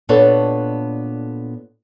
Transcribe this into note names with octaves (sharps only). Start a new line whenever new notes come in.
A#2 B3 D4 A4 C#5